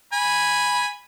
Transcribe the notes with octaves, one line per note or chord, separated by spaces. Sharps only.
G#5 B5